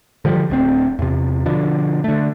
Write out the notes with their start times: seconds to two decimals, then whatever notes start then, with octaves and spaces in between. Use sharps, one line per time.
0.25 D3 F3 G3
0.50 D1 D2 C4
0.99 E2 C3
1.46 B2 D3 F3
2.04 D3 A3